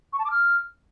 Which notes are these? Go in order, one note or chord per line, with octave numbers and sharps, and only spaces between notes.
C#6
A5
D6
F6